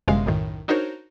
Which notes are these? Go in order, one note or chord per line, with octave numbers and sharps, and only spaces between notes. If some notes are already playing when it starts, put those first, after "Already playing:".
G1 F#2 C3 G#3 F5
B1 F#2 A2 D#3
D4 D#4 F#4 A#4 C5 C#5